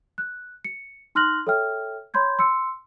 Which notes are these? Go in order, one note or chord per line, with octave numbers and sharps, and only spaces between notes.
F#6
C#7
D#4 C6 F6 F#6 A#6 F#7
A4 C#5 E5 G5 F6
C#5 B5 C6 G6 G#6
C6 E6 C#7